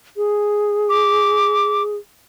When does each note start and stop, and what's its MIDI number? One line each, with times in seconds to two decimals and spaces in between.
0.17 1.96 68
0.89 1.83 86